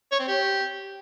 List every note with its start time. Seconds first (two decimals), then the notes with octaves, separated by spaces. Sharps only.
0.12 C#5
0.20 C4
0.28 G4